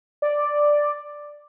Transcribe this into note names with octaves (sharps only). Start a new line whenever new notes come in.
D5